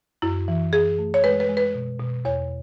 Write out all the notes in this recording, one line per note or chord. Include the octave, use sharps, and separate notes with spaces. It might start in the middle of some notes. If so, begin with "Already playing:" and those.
F#2 E4
E3
F#2 G#4
A3
C#5
G#3 B4
B4
G#3
B4
B2
B2
E2 C#5